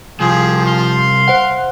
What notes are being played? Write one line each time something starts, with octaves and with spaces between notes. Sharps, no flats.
C2 F3 F4 G4 G#4
F5 C6
C5 F#5